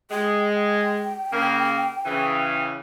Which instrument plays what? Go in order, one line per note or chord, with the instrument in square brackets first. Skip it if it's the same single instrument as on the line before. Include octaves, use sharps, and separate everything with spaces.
[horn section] G#3 [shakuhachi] G5
[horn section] C#3 A#3
C#3 E3